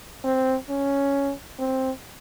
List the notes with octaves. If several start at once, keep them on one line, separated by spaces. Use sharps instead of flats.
C4
C#4
C4